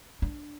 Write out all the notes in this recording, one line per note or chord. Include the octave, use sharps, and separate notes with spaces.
D4